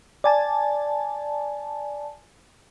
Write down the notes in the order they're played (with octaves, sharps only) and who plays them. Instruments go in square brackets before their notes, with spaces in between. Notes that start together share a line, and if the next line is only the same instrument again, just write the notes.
[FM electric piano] D5 G#5 A5